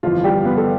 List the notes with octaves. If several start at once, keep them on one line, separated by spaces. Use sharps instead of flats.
G1 F2 E3 F3 F4
G3 G4
B3 B4
A4